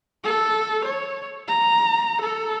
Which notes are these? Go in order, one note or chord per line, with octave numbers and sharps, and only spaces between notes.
A4
C#5
A#5
A4